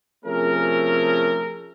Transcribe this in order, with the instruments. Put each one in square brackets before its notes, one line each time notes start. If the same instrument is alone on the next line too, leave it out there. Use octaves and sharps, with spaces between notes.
[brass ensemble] C3 F3 A3 C#4 G#4 A#4